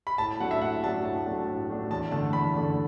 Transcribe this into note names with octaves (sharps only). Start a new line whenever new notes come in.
B5
A2 A5
F#3 A3 D4 F#5
E5
A2 F#5
F#3 A3 D4 A5
A2 A5
F#3 A3 D4
A2
F#3 A3 D4
E2 A5
D3 A3 D4 A5
E2 B5
D3 A3 D4